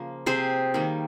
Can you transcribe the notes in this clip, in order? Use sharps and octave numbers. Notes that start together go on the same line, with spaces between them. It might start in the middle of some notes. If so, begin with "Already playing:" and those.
Already playing: C#3 F3 A#3
C3 G#4 C5
D#3 G3 A#3